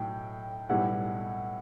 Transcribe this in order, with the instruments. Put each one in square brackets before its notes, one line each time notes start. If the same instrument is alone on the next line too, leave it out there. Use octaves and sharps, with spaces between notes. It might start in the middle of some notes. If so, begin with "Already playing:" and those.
Already playing: [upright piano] B1 A2 F#3 [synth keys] G5
[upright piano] B1 A2 G3 B3 E4 [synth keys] F#5